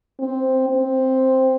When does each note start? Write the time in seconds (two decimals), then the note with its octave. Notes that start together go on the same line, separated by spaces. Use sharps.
0.20 C4
0.69 C4